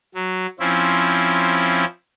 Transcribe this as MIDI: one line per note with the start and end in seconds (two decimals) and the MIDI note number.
0.15 0.47 54
0.60 1.85 53
0.60 1.85 60
0.60 1.85 61
0.60 1.85 64